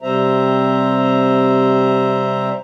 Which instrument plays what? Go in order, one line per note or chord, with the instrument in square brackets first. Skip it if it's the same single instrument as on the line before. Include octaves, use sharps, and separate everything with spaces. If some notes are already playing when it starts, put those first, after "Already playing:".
[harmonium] C3 G3 C4 C5 E5 A#5